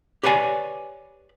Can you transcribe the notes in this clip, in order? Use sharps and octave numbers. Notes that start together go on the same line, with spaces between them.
G4 B4 C#5 D5 G#5